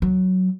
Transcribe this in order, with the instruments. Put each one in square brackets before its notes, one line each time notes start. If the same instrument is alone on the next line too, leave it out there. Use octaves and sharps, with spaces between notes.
[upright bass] F#3